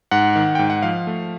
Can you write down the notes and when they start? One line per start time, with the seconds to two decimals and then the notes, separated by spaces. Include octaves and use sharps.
0.11 G#2 F#5
0.35 D#3
0.55 G#2 G5
0.70 F#5
0.82 F3 F5
1.07 A3